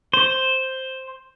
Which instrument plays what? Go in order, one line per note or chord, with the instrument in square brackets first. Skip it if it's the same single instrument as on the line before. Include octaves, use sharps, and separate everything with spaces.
[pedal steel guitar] C5